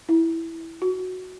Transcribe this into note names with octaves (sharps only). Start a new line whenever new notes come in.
E4
F#4